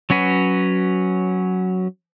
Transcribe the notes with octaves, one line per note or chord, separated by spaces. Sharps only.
F#3 C#4 F#4 B4